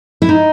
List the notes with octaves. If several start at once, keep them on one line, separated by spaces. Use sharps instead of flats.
E4
D#4